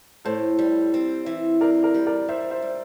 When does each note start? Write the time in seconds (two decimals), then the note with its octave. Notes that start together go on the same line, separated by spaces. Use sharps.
0.25 A2 A4 C5
0.59 G3
0.94 C4
1.26 E3
1.61 C4 A#4 D5
1.83 A#4 D5
1.94 G3
2.07 A#4 D5
2.28 G3 C5 E5
2.51 C5 E5
2.62 G3